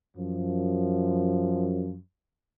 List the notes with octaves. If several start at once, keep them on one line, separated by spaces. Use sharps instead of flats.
F#2 F3